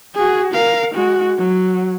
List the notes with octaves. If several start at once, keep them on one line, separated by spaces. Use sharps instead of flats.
F#4 G#4
A#4 F5
G#3 F#4
F#3